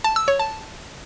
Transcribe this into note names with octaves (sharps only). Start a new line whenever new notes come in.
A5
E6
C#5
A5